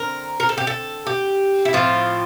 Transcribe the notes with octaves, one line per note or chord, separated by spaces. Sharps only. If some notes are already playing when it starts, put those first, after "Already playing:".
Already playing: D3 C4 A#4
A#4
A4
G4
A4
G4
E4
A2 F3 C4 F4